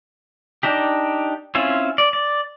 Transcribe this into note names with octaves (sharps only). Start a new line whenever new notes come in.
D4 D#4 G4
C4 C#4 E4 F4
D5
D5